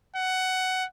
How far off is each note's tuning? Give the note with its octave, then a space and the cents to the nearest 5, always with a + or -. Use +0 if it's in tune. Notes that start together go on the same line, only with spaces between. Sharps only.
F#5 +15